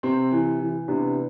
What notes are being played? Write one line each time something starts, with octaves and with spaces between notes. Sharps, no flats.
C3 C4
E3
E3
C3 B3 D4